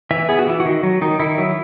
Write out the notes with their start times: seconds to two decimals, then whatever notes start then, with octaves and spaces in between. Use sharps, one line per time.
0.11 E3 E5
0.29 B3 G#4
0.39 F#4
0.47 E3 E4
0.60 F#4
0.65 D#3
0.83 F#3
1.01 D#3 D#4
1.19 D#3 E4
1.38 F#3